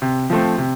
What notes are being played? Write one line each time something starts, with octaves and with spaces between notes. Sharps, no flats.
C3
F3 A3 C4
C3